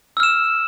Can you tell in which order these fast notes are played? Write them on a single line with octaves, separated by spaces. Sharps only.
E6 F6 E7